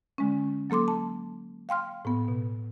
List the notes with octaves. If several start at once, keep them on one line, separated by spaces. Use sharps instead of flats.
D3 G#3 C#4
F#3 A#3 A4 C6 D6
A5
F5 G5 C6 F6
A2 B3
B2